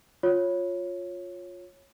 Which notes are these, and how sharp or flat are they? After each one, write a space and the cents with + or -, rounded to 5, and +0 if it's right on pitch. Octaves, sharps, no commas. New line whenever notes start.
F4 +15 C#5 -10